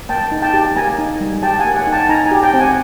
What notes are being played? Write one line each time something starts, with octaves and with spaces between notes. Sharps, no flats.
A#3 G5 A5
D#4
G5 A5
G4
A#3 G#5 A#5
D#4
G3
G4 G5 A5
F#5 G#5
A#3
F#5 G#5
D#4
G5 A5
D#4 G#5 A#5
G#5 A#5
G4
G5 A5
C4
F#5 G#5